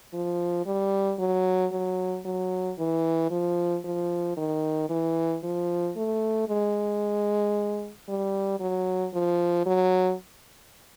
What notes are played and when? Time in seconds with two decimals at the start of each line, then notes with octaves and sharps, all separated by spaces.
0.14 F3
0.66 G3
1.19 F#3
1.72 F#3
2.25 F#3
2.79 E3
3.31 F3
3.84 F3
4.37 D#3
4.90 E3
5.43 F3
5.96 A3
6.48 G#3
8.08 G3
8.60 F#3
9.14 F3
9.66 F#3